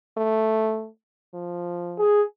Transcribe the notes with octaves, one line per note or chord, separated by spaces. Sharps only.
A3
F3
G#4